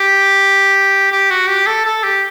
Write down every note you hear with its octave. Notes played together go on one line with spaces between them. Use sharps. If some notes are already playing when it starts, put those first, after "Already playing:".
Already playing: G4
G4
F#4
G4
A4
A4
G4